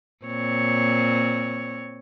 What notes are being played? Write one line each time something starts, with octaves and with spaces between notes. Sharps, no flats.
A#2 C4 C#5